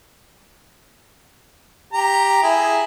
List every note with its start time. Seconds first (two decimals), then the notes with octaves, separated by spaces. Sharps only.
1.93 G4 A#5
2.43 E4 G#4